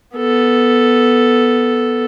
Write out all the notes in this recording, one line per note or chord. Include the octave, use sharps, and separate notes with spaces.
B3 A4